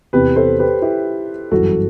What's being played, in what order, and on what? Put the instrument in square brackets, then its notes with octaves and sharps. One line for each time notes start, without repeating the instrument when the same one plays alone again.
[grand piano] E2 C3 E3 [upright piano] G4 B4
[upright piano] A4 C5
G4 B4
E4 G4
[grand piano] G1 F#2 E3 [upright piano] F#4 A4